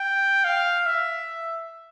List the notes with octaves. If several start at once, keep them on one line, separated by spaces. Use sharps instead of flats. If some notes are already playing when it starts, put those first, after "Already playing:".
Already playing: G5
F5
E5